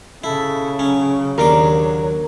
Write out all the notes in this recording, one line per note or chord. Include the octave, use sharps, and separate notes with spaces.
C#3 E4 A4
F#3 C#4
D#2 D4 A#4 D6